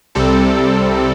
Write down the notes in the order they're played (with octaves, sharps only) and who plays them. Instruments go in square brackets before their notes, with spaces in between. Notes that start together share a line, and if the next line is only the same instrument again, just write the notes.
[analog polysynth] C2 C3 G3 C4 A4